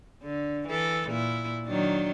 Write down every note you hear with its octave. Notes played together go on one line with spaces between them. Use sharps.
D3
E3 A4
A#2 E4
D#3 F#3 D4